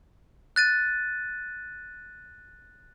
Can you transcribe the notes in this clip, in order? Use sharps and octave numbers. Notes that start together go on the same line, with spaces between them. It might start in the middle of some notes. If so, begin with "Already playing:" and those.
F#6 A6 D#7